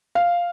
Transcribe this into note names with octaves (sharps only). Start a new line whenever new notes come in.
F5